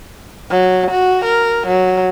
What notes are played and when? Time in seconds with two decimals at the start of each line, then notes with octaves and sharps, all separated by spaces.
0.50 F#3
0.91 F#4
1.25 A#4
1.67 F#3